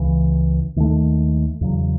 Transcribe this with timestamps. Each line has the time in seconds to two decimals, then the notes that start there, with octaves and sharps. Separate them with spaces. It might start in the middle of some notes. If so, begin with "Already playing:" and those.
Already playing: C#2 C#3 E3
0.76 D#2 D#3 A3
1.61 E2 C#3 F#3